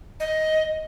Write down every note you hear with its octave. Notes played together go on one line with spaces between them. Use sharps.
D#5